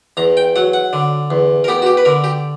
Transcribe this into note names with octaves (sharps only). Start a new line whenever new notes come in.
E2 A#5
G5
F#3 F#5
F#5
D3
E2
A#4
B3 G4
F#4
G4
B4
D3 A#4
G4